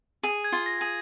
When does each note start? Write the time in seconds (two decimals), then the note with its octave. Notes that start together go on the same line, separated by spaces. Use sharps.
0.23 G#4
0.44 G#6
0.52 F4
0.66 A#6
0.81 G#4